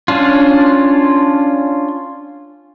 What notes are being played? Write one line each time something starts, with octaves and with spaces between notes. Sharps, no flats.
C#4 D4 F4